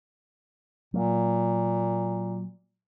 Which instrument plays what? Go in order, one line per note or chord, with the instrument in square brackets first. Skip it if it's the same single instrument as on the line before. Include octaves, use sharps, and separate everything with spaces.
[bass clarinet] A#2 [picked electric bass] F#3 A#3